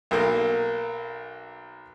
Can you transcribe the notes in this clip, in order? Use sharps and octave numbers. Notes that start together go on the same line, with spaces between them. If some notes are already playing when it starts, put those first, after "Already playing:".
B1 A#3